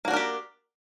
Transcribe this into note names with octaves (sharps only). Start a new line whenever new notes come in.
A#3 D4 F#4 G4 A#4